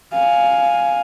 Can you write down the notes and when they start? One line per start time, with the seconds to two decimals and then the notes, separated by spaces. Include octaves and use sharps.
0.13 F5 G#5